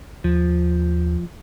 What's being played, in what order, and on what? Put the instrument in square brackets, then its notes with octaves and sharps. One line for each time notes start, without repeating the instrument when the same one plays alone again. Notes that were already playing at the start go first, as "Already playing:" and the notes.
[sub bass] D#2 [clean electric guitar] F3